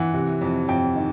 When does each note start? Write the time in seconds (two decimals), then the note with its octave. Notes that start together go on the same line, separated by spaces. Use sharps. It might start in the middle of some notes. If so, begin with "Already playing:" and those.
Already playing: E3 F#5
0.14 C3
0.41 F2
0.68 F2 G5
0.95 D#3